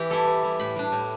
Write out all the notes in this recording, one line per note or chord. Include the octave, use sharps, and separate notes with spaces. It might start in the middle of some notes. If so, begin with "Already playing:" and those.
Already playing: E3 G4
G3 E4 A4
E3
G3 E4
A2 B5
G3 D4
A2